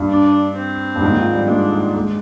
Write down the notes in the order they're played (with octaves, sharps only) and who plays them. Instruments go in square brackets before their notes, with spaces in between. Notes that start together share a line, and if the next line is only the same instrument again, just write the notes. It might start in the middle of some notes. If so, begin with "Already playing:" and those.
Already playing: [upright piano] G2
[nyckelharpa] D4
C4
[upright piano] G2
G#2
D#3
F3
G3
[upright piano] G#3 [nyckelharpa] D4
[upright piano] A#3
G#3